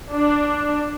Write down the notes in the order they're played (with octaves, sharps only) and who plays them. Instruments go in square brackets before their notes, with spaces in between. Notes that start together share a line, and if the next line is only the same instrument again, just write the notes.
[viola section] D4